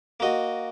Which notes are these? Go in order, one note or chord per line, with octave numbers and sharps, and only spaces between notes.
A#3 F#4 D#5